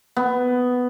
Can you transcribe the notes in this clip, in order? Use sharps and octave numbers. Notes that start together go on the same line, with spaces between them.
B3